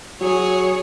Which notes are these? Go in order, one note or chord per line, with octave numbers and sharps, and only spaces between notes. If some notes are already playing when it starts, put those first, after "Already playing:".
F#3 G#4 C#5